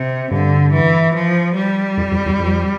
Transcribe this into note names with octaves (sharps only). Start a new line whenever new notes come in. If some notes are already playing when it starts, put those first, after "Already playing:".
Already playing: C3
G2 D3
E3
F3
G3
F2
F2
E2
F2